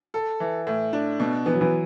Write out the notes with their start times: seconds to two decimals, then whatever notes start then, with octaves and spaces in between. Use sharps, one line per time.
0.14 A4
0.40 E3
0.67 A2
0.93 D4
1.20 B2
1.46 E3 B3
1.54 F#3
1.61 E3